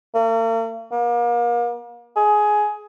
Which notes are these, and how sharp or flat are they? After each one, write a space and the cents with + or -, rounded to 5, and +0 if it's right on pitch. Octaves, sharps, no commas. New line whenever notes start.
A#3 -45
A#3 +35
G#4 +15